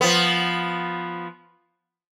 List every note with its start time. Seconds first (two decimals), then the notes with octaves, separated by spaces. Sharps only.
0.01 F3 B3